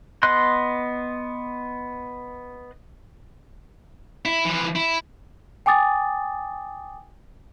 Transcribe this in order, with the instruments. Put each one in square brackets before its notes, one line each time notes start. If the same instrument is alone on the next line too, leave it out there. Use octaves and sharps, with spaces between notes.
[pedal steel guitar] B3 D#5 C6 F#6
[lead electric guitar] E4
E3 F3
E4
[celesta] G5 G#5 D6 D#6 A6